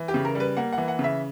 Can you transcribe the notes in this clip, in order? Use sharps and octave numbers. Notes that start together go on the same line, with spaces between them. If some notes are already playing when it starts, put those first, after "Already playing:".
Already playing: E3
G4
C#3
A#4
G3
B4
A#3 F#5
F#5
E3
F#5
C#3
E5